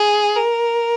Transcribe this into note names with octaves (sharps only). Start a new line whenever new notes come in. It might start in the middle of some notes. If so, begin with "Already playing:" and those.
Already playing: G#4
A#4